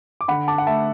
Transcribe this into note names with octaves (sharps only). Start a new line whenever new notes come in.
D6
D3 F#5 B5
A5 D6
F#5
A3 E5 A5